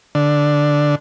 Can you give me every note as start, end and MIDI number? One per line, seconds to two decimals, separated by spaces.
0.15 0.95 50